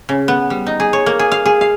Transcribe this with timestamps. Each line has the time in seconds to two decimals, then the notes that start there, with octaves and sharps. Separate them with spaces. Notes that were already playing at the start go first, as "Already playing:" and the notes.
0.09 C#3
0.28 B3
0.50 G3
0.66 D#4
0.80 G#4
0.93 C#5
1.06 A#3
1.19 G#4
1.32 F5
1.46 G#4
1.61 F5